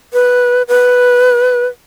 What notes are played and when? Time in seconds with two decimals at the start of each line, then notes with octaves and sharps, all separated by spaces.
0.13 B4
0.68 B4